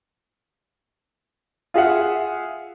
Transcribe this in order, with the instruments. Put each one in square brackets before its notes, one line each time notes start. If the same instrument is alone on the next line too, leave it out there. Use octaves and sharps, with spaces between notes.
[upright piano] F4 G#4 E5 F#5